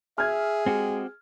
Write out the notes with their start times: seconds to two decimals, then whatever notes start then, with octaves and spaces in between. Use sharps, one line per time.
0.18 G#4 E5 F6 G#6
0.66 G#3 C4 F#4 G4